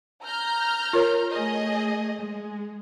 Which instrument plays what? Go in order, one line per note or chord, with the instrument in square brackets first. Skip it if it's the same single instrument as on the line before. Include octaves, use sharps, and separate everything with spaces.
[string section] A#5 F6 G6
[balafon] F4 A#4 C#5
[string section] A3 G#4 D#5
G#3